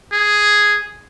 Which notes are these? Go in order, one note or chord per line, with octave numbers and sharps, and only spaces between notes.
G#4